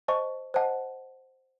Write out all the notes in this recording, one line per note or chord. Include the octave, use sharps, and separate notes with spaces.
C5 D#5 A5 C#6
C5 D#5 F#5 A5